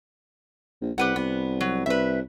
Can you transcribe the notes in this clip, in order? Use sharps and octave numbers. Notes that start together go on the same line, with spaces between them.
A#1
C2 G4 B4 F#5
C2 B3
F#3
C2 B4 E5